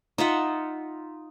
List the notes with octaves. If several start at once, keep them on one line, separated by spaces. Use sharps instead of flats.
D#4 F4 E5 F#5